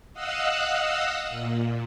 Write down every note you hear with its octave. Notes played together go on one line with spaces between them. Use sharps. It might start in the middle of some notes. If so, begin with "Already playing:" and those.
D#5 F5 F#5 D#6 E6 F#6
A#2